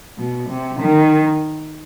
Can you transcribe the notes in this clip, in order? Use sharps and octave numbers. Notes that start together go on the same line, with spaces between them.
B2
C3
D#3